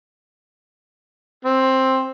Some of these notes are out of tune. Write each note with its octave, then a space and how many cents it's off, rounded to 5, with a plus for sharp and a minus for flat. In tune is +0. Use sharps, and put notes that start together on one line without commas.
C4 +10